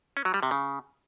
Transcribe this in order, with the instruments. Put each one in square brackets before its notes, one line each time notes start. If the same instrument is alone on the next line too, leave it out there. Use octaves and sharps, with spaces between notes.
[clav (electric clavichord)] C#4
F#3
G3
C3
C#3